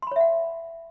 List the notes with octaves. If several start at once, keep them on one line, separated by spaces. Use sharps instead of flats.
C#5 E5 F#5 B5 C6